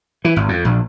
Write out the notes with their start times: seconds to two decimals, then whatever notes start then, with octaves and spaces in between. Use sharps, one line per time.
0.25 E3
0.36 G#1
0.49 F2
0.65 A#1